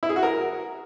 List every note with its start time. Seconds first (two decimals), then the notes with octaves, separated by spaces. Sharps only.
0.03 E4
0.09 G#4
0.16 F#4
0.23 A#4